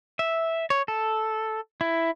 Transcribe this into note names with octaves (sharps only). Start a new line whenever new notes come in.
E5
C#5
A4
E4